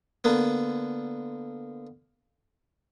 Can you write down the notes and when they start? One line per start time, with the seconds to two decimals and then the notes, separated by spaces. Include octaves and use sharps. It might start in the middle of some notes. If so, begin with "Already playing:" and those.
0.24 D3 A#3 B3